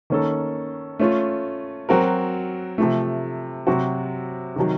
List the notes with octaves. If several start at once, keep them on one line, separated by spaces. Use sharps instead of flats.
D#3 A#3 C#4 A4
A3 C#4 F4
F#3 C4 F#4 A#4
C3 F3 A3
C3 F#3 C4 F#4
C3 D#3 F#3